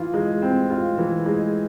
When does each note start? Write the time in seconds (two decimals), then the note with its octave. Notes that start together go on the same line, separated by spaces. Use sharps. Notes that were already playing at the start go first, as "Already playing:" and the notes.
Already playing: E3 F4
0.14 G#3
0.42 C4
0.70 F4
0.98 E3
1.26 G#3